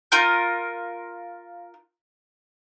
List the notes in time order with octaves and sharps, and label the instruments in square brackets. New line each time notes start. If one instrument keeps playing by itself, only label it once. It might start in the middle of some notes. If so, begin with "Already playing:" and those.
[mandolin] F4 A#4 G6